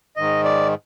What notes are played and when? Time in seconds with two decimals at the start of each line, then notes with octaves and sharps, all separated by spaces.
0.17 G#2 D#3 D#5
0.44 D5